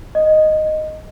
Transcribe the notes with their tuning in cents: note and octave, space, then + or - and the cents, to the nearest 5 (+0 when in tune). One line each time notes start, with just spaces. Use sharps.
D#5 -5